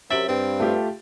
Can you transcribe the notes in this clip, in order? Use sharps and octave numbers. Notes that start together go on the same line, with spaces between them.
F#2 C3 E5 A6 D7 F#7
G2 C4
A3 F4 G4